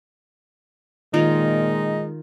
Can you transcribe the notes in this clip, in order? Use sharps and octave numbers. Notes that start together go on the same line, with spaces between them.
A#2 D#3 G#3 D#4 F4 A#4